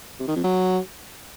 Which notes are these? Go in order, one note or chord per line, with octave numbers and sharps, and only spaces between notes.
C3
D#3
F2
F#3